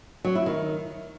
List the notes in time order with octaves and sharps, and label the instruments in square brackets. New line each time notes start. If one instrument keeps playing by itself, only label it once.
[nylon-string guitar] F#3
E4
D#3